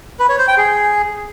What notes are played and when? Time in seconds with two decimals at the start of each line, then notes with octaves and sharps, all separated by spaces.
0.19 B4
0.29 C#5
0.38 C5
0.48 G5
0.57 G#4